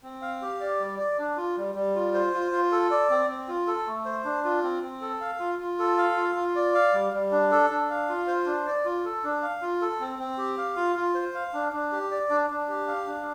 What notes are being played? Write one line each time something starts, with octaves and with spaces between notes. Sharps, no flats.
C4
F5
G4
D5
G3
D5
D4
F4
G3
G3
F4
C5
F4
F4
A4
D5
C4
C4
F4
A4
A3
C5
D4
F4
C4
C4
A4
F5
F4
F4
A4
F5
F4
F4
D5
F5
G3
G3
D4
A4
D4
F5
F4
C5
D4
D5
F4
A4
D4
F5
F4
A4
C4
C4
G4
F5
F4
F4
C5
F5
D4
D4
G4
D5
D4
D4
G4
F5
D4